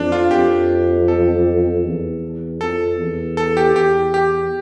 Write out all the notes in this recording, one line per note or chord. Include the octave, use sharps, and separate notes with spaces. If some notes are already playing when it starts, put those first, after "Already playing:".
Already playing: F2 D4
F4
F2 G4
A4
E2
F2 A4
E2
A4
G4
E2 G4
G4